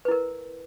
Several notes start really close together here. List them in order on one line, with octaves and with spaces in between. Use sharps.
B4 E4 A#4